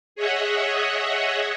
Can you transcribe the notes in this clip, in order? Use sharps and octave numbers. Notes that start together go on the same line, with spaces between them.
G#4 C#5 D#5 E5 F#5